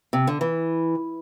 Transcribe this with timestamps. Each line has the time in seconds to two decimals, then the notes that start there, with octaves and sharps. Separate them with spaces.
0.13 C3
0.27 D3
0.41 E3